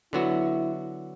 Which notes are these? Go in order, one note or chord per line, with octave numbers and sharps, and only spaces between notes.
D3 F#3 B3 E4 F#4